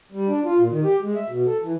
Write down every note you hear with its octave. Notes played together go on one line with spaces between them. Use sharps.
G3
D4
F4
A#2
D#3
G4
G#3
E5
B2
A4
E3